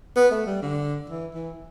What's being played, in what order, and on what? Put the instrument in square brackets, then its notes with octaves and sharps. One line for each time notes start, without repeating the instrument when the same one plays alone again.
[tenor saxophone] B3
A3
G3
D3
E3
E3